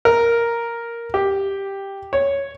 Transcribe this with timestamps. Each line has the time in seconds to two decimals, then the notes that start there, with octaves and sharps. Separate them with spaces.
0.05 A#4
1.14 G4
2.13 C#5